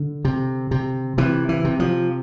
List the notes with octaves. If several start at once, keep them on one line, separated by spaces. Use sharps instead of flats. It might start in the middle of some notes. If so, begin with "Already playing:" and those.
Already playing: D3
C3
C3
C3 E3
E3
C3
F3